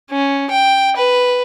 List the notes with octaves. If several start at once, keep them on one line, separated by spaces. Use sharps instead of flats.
C#4
G5
B4